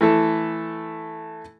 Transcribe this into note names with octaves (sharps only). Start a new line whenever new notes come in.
E3 A3 A4